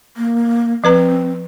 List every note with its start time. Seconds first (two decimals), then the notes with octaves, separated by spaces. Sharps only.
0.17 A#3
0.84 F3 C4 B4 A#5